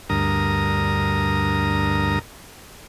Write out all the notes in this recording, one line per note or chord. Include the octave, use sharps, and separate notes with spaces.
D2 G2 A#4 A#5 D#6